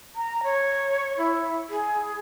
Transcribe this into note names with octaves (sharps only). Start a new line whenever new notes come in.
A#5
C#5
E4
G#4